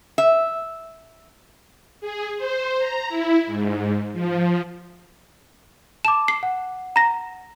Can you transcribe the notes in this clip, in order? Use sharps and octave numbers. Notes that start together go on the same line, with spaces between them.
E5
G#4
C5
A#5
E4
G#2
F3
A5 D6 E7
C7
F#5
A#5 A#6